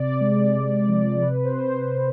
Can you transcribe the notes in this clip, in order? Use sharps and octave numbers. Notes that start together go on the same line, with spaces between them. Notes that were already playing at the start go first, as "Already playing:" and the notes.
Already playing: C3 D5
G#3
C3
F3
C3 B4
C5